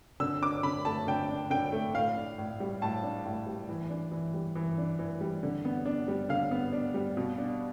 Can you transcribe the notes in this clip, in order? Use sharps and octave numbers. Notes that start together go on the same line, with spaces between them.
D3 E6
D4 D6
D3 B5
A3 A5
D3 G5
D4
D3 G5
A3
A2 F5
D4
A2
G3
A2 A5
D4
A2
G3
E3
D4
E3
G3
E3
D4
E3
G3
D3
B3
D4
G3
D3 F5
B3
D4
G3
B2
D4